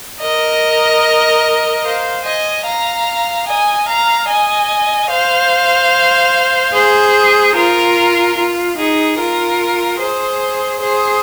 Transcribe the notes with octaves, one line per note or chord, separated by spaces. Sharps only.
A#4 D#5
C5 F5
D#5 G#5
F5 A#5
D#5 G#5
F5 A#5
D#5 G#5
C5 F5
G#4 C5
F4 A#4
F4
D#4 G#4
F4 A#4
G#4 C5
G#4 C5